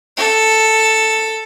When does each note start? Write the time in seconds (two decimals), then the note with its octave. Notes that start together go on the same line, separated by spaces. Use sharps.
0.17 A4